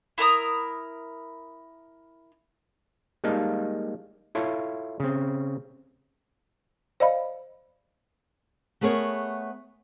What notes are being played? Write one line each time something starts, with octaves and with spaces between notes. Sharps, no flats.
E4 A#4 A#5 D#6
G3 G#3 A#3 D#4 F5 A5
E4 F4 A4 C#5
C#3 C4
C5 D5 D#5 F5 B5
A3 B3 G#4 A#4 C5 C#5